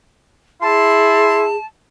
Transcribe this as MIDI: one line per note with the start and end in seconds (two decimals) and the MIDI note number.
0.62 1.48 64
0.62 1.56 68
0.62 1.65 81
0.62 1.43 84